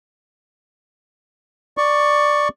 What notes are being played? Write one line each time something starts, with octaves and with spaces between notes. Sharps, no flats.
D5 C#6